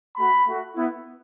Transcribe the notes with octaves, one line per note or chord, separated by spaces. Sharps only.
A3 F#4 B5
A3 F#4
B3 E4